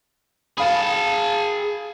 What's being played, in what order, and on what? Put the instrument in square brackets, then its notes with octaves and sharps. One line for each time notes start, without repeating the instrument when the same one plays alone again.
[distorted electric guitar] G#4 A5 [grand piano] F5 B5